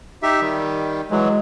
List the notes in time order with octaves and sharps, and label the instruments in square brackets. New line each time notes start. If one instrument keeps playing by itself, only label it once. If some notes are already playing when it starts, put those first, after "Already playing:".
[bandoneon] D#4 G4 E5
D#3 G3
[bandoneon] E3 F#3 [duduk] G#3